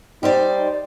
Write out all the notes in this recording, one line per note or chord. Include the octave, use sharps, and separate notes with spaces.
G3 D#4 C5 D5